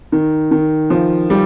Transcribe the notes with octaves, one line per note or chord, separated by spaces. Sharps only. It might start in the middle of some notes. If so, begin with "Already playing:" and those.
D#3
D#3
F3
G3